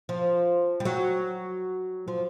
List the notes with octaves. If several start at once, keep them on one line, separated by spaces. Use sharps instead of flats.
F3
G3
F#3
F3